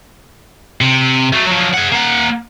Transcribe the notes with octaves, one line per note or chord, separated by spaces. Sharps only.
C3
F#3 A3
F3 F#3
G#4 F#5
A#3 F#5